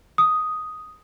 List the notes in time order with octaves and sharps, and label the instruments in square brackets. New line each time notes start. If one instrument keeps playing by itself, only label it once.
[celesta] D#6